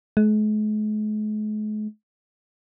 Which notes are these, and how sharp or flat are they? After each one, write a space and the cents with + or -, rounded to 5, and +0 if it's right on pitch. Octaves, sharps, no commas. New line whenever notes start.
G#3 +45